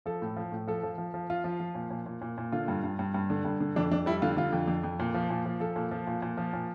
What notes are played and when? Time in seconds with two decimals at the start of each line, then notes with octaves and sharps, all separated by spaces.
0.06 F3 A4
0.22 A2
0.36 F3
0.52 A2
0.67 F3 A4
0.83 F3
0.98 F3
1.14 F3
1.30 F3 F4
1.44 F3
1.60 F3
1.75 A#2
1.90 A#2
2.06 A#2
2.22 A#2
2.38 A#2
2.52 D3 F4
2.68 G2
2.84 G2
2.99 G2
3.14 G2
3.30 D3
3.45 G2
3.61 D3
3.76 F2 D4
3.91 F2 D4
4.06 G3 E4
4.22 D3 F4
4.37 D3 F4
4.53 F2
4.68 F2
4.83 F2
5.00 A#2
5.14 F3
5.30 A#2
5.45 F3
5.60 F3 A4
5.76 A#2
5.91 F3
6.07 A#2
6.22 A#2
6.37 F3
6.53 A#2